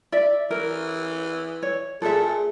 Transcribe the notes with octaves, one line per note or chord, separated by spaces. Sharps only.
D5 E5
E3 A#4
C#5
A#2 G#4 A4 E5